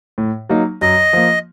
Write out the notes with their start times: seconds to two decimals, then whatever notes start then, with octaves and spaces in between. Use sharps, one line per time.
0.18 A2
0.50 F#3 A#3 D#4
0.81 F#2 D#5
1.13 F3 A#3